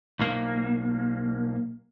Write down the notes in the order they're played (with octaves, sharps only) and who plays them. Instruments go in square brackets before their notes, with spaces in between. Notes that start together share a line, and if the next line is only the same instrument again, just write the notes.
[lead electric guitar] B1 A#3